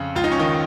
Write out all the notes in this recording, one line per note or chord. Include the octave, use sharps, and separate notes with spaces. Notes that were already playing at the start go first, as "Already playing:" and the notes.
Already playing: F2 C#3
C#2 F4
D#4
C#4
D#3 D#4